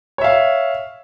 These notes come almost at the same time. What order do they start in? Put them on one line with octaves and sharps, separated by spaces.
C#5 E5 F5